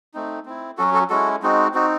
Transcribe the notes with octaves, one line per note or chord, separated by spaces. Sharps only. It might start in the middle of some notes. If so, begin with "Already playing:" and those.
A3 C4 D#4
C4 E4
F#3 C#4 F#4 A4
F#4 A4
G#3 C#4 E4 F#4 A4
G#3 C4 D#4 F#4
C4 D#4 F#4